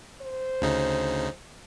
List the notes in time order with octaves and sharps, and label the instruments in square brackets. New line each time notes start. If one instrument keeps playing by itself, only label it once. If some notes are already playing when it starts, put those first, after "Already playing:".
[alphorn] C5
[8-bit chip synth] D2 C#3 D#4